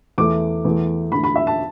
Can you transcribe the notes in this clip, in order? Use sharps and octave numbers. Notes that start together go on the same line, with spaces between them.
E2 E3 A3 D6
E2 E3 A3
E2 D3 A3 B5
B5
E5
A5